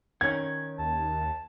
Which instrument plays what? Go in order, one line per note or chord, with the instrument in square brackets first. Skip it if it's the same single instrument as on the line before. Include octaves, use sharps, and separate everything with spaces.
[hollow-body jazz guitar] D#3 C#4 [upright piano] G#6
[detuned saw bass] D#2 [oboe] A5